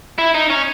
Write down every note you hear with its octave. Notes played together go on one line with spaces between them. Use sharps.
E4
D#4
C#4